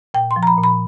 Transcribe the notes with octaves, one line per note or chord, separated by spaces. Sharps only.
A#2 G5
C6
F3
A#5
B5
A#2
B5